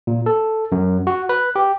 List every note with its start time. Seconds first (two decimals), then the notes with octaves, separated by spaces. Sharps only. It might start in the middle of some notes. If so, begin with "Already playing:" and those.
0.07 A#2
0.26 A4
0.72 F#2
1.07 F#4
1.29 B4
1.56 G4